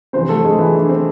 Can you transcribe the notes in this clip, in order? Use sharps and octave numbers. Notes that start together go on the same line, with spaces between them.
F2 C3 E3 C4 C5
A3 A4
G#3 G#4
E3 E4
D4
C4